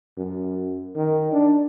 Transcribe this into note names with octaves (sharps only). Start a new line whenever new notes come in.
F#2
D#3
D4